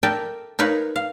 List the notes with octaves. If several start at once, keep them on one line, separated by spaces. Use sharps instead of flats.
A4 A#4 D5 E5 G5 A5
D#4 A#4 B4 C#5 F5
F5